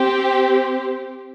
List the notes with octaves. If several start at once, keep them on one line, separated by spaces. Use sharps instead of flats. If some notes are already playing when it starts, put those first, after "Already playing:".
Already playing: C4 G4